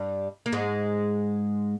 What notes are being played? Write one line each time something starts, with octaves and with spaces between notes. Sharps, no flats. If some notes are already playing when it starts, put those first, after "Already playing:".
Already playing: G2 G3
A#3
G#2 G#3